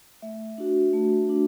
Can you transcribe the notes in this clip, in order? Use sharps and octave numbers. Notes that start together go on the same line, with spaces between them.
A3 E5
D4 F#4
A3
D4